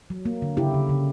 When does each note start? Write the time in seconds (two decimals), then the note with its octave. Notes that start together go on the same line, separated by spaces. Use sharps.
0.10 F#3
0.25 A#3
0.42 D3
0.57 C#3 E4 G4
0.74 C#3
0.89 C#3